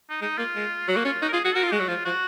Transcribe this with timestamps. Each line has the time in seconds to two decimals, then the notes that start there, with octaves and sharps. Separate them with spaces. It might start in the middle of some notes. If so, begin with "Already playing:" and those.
0.10 D#4
0.21 G#3 D#4
0.38 A#3 F4
0.56 G#3
0.88 F#3 F#4
0.96 A#3
1.05 C#4 F4
1.22 D#4 F#4
1.28 A#4
1.33 F4 G#4
1.45 F#4 G#4
1.55 F#4 A#4
1.63 F4
1.72 G#3 F#4
1.80 F#3
1.88 F3 F4
2.05 F3 F#4